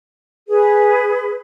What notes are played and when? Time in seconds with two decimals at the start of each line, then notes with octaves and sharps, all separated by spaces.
0.48 G#4 B4